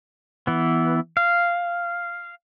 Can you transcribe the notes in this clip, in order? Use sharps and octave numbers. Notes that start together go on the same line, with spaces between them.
E3 B3
F5